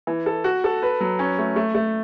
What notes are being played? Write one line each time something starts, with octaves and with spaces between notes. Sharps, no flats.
E3
A4
F#4
A4
B4
F#3
C#4
A3
A3
A3